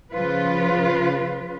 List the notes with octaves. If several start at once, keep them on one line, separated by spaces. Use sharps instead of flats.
C#3 F3 F4 B4